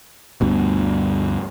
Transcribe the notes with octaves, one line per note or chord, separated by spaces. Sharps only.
D2 G2 B2